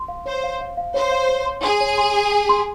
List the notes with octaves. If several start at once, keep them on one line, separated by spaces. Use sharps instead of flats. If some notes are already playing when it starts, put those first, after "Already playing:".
Already playing: C6
F5
C5 C#5
F5
F5
F5
C5 C#5
F5
C#5
C6
G#4 C6
C#5
C6
G#5
G#5
C6